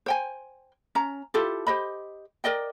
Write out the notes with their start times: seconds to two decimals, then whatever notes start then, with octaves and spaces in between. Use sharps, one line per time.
0.06 C5 G5 G#5
0.95 C#4 A#5
1.34 E4 F4 G4 A4
1.67 G4 C5 D#5 B5
2.44 A#4 D5 D#5 G5